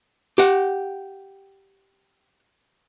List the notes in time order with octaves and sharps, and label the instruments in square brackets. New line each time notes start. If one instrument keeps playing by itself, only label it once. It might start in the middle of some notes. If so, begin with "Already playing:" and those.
[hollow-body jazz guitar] G4 F#5